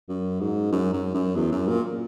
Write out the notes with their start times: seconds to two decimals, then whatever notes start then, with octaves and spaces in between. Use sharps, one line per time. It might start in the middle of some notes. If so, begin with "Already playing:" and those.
0.09 F#2
0.40 G#2
0.72 F#2
0.93 F#2
1.14 F#2
1.36 E2
1.52 F#2
1.68 A#2